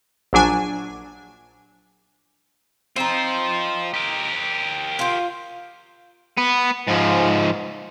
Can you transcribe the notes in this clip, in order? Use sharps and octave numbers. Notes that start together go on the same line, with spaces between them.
A#1 F#3 D4 G#5
C4 D#4 F4 C5
G4 A#4
F4 C5
B3
G#2 F3